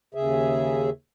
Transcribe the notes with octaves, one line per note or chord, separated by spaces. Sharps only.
D#2 C#3 G#4 E5